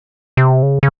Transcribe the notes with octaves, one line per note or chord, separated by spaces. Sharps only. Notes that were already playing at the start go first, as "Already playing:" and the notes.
C3
C#3
C#3